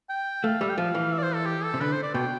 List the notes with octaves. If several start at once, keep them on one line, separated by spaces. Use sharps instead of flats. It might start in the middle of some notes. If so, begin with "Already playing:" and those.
G5
A3 F5
G3 E5
G5
F3 F5
E3
E5
D5
C5
A4
G4
A4
C3
D3 B4
C5
D5
B2 G5